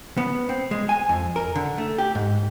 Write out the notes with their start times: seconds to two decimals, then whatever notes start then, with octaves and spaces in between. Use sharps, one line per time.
0.17 B3
0.49 C4
0.71 G#3
0.89 G#5
1.09 F2
1.36 A#4
1.55 D3
1.78 A3
1.98 G4
2.15 G#2